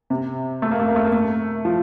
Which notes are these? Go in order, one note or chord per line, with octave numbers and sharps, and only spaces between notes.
C3
A3
A#3
A3
A#3
A3
A#3
A3
F3